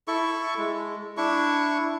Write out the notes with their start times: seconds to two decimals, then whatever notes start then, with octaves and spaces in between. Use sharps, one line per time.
0.08 E4 A4 C#6
0.58 G#3
1.17 D4 E4 C#6